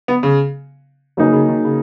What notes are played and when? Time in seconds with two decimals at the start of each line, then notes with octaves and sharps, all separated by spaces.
0.08 B3
0.23 C#3
1.17 C#3 F#3 A#3 D#4 G#4
1.33 C#3
1.49 D#3
1.64 C#3